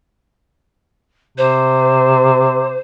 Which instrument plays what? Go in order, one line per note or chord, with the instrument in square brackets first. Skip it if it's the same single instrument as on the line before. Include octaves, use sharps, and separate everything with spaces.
[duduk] C3 [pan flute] C5